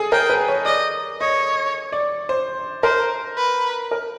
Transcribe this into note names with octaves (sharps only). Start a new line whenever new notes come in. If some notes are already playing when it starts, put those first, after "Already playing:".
Already playing: G#4 A4
A#4 G5
B4
C#5
D5 D#5
C#5 D#5
D5
C5
A#4 C5
B4
A#4